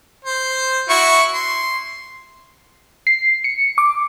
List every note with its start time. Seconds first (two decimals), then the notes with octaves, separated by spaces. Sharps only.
0.25 C5
0.89 E4 F#4 C#6
1.34 C6
3.07 C7
3.44 C#7
3.78 D6